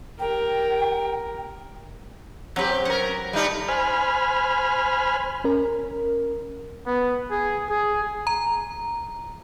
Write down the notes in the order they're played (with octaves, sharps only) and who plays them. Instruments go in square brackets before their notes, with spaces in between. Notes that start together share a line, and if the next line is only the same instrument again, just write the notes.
[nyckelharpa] G4 A#4 [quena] G5
[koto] F#3 B4 [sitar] C4 G4
[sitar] C#4 A#4 [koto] F#5
[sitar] G3 A3 D#4
[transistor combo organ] C5 G#5 B5 F6
[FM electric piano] C#4 A#4
[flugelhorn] B3
G#4
G#4
[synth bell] A#5